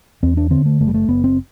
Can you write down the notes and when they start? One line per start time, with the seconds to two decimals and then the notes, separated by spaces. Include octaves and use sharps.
0.23 E2 C4
0.37 D4
0.50 D3 C4
0.66 A3
0.80 F#1 A3
0.88 G3
0.94 A3
1.09 F#1 B3
1.24 C4